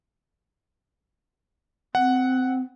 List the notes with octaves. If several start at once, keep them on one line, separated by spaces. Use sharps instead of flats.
C4 F#5